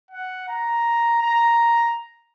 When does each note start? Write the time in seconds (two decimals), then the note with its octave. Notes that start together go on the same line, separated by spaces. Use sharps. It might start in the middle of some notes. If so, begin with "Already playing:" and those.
0.11 F#5
0.49 A#5
1.22 A#5